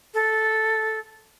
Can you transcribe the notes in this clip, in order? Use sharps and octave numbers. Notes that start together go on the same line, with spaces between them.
A4